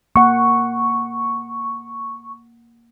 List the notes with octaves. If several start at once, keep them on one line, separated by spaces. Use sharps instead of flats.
A#3 F#5 C#6